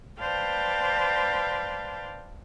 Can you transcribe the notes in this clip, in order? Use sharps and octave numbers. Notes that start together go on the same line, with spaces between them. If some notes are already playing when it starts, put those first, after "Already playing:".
B4 C5 D5 F5 G5 A5